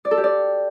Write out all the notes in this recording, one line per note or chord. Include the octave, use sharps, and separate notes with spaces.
D5
A4
G4
D5